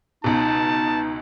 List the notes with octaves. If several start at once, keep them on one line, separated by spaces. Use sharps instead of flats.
C#2 B2 D#4 A5